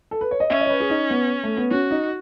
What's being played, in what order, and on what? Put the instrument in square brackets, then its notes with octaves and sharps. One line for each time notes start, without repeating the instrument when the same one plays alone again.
[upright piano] A4
B4
C#5
D#5
[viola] C#4 [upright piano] E5
[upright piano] D#5
C#5
B4
G#4
D#4
B3
A3
B3
[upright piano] C#4 [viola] F#4
[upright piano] D#4